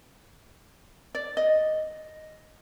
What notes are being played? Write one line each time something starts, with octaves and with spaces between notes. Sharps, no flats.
D5
D#5